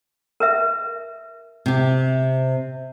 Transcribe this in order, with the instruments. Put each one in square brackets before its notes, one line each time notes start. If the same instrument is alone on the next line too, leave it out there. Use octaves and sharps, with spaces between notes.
[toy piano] A#4 B4 E5
[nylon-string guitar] C3 G4